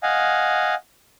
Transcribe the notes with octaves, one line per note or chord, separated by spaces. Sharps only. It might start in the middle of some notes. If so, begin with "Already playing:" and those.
D#5 F5 F#5 G#5